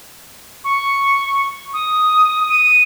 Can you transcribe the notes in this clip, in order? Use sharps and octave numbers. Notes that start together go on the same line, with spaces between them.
C#6
D#6
D#7